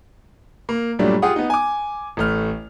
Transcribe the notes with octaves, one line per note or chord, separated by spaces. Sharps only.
A#3
G2 A#2 F#3 G3 A3 D4
F4 G4 G#4 F#5 D#6
B3 D#4
G#5 D6
A1 A3 F6